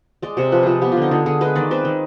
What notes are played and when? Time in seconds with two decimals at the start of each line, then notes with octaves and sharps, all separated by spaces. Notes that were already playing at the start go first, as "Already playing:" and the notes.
0.22 G#3 D5
0.37 C3 C5
0.52 F3 B4
0.63 F3 G#4
0.82 B3 G4
0.92 F4
0.97 D3 D#4
1.11 D3 F4
1.26 D3 G#4
1.41 G#3 B4
1.55 D#3 D5
1.71 C4 B4
1.85 D#3